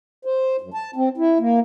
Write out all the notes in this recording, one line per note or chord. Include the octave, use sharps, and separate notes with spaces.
C5
F#2
A5
C4
E4
A#3